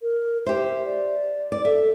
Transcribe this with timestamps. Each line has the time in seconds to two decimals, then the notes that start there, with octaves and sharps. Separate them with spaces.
0.02 A#4
0.46 G4 C5 E5
0.85 D5
1.52 D5
1.65 A4 E5